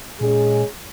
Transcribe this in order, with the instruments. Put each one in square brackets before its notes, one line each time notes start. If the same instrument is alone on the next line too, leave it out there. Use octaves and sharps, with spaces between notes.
[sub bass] A#2 [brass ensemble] G#3 C#4 G#4